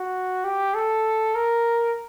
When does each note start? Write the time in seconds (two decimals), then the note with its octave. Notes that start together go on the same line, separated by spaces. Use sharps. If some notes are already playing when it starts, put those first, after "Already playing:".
Already playing: F#4
0.44 G4
0.75 A4
1.35 A#4